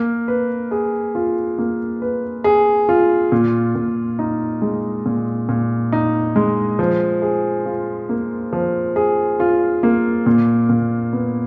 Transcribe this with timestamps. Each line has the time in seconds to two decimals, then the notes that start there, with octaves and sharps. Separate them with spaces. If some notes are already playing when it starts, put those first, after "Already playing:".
Already playing: A#3
0.28 B4
0.71 G#4
1.15 F4
1.58 A#3
2.02 B4
2.44 G#4
2.89 F4
3.32 A#2
3.75 A#2
4.19 D#4
4.62 G#3
5.06 A#2
5.49 A#2
5.92 D#4
6.36 G#3
6.79 F3
7.22 G#4
7.66 F4
8.09 A#3
8.53 F3
8.96 G#4
9.40 F4
9.83 A#3
10.26 A#2
10.69 A#2
11.13 B3